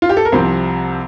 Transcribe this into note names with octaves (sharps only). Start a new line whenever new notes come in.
F4
G4
A4
A#4
C2 C3 F3 C4 C5